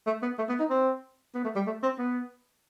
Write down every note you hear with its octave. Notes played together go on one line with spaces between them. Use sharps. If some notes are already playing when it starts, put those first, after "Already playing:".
A3
B3
A3
B3
D#4
C4
B3
A3
G3
A3
C4
B3